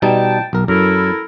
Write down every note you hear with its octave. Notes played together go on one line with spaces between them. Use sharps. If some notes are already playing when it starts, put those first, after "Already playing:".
B2 G3 D#4 G5 A5
B1 A#4
F#2 E4 A4 A#4